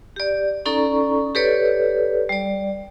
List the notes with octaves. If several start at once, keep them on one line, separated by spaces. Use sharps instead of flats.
G4 D5
C#4 D#4 A4 D5 A#5 C#6
G4 A4 B4 C#5 D5
G3 D5